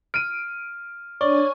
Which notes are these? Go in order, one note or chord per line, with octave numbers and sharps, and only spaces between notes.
F6 D7 D#7
D4 C#5 D5 G#5 C#6